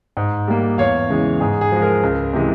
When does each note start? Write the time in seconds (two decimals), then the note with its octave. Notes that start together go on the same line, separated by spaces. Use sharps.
0.17 G#2
0.48 G3 A#3
0.78 E2 C#5 F5
1.09 C#3 E3 G#3
1.40 G#2 G#4
1.61 G#4
1.72 F3 G#3
1.82 A#4
2.03 C#2
2.33 C3 E3 G#3